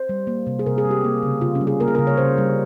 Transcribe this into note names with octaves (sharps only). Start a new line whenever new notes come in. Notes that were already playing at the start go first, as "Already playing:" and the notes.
Already playing: C5
G3
A#3
C3
G#4
C3 A#4
G#4
G3
G4
A#3
C#3
C#3 F4
C#4
G3
G#4
A#3 A#4
G#4
C#3 A#4
C#5
C#3 C5
G3